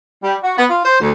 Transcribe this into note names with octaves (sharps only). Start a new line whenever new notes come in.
G3
F#4
B3
F4
C5
D2